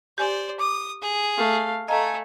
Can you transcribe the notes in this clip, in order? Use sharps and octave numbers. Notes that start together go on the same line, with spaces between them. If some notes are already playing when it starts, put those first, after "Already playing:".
G4 C5 D5 G#5
D6 D#6
G#4
A3 F5
A3 A4 D#5 F5 G#5 A#5